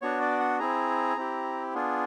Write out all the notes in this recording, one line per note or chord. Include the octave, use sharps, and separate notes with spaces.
B3 D4 F#4 C#5
D5
F#5
C4 E4 G#4 A#5
C4 E4 G4
B3 D4 F4 G#4